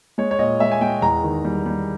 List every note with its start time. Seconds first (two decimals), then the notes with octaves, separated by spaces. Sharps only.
0.18 G#3 C#5
0.31 C#5
0.39 A#2 D#5
0.60 G#3 E5
0.72 G#5
0.81 G#3 G5
1.02 E2 A#5
1.24 D#3
1.45 G3
1.66 G3